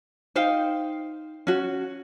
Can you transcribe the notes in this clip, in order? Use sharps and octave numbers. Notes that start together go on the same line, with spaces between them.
D#4 C5 F5 G5
C#4 F#4